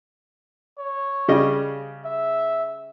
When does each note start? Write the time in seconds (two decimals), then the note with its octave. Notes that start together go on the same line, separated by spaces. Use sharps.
0.78 C#5
1.28 C#3 G3 D#5
2.05 E5